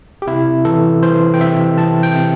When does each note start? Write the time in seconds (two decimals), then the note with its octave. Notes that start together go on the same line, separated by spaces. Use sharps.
0.22 G4
0.27 C3 E4
0.65 E3 A4
1.03 E3 C5
1.34 G5
1.41 C3 E5
1.78 C4 A5
2.03 G5
2.16 C3